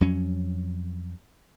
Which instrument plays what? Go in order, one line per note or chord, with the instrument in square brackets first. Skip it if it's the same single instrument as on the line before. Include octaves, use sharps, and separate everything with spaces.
[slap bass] F2 F#3 C#4